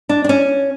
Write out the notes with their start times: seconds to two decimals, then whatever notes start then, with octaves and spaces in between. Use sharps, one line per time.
0.09 D4
0.24 D4
0.29 C#4